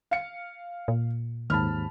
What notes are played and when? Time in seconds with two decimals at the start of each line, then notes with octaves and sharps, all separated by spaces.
0.11 F5 C#7
0.88 A#2
1.50 D#2 G#2 A5 B5 F6